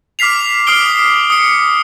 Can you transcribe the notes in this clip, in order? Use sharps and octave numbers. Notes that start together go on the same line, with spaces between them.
D6 F6 B6 C7 F7
D6 D#6 F6 C7 D7 G7
D#6 C#7